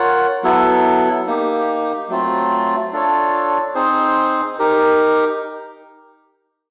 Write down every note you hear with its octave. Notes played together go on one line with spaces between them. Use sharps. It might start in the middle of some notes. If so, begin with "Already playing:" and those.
Already playing: F4 A#4 C#5 F#5
F#3 B3 E4 A4
A#3 D#4 G4
F#3 A3 C4 F4
D4 F4 A4 C#5
C4 D#4 G#4 C5
D#4 G4 A#4